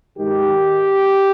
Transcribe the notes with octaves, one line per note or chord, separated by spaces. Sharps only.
G#2 D#3 G4